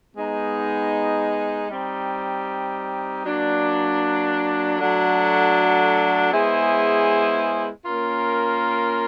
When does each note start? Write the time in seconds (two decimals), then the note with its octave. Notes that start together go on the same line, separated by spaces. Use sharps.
0.15 G#3 B3 D#4
1.69 G3 C4 D#4
3.23 F#3 A#3 D4
4.77 F#3 A3 D4 F#4 A4
6.31 G#3 B3 E4 G#4 C5
7.85 A#3 C#4 F4 A#4